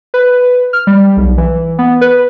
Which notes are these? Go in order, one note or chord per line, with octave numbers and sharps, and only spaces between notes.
B4
F6
G3
B1
E3
B3
B4